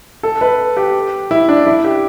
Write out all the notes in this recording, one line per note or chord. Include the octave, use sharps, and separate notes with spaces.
A4
B4
G4
E4
D4
E4
G4